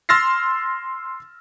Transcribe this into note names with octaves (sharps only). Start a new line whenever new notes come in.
C6 E6 F6 A6 A#6 C7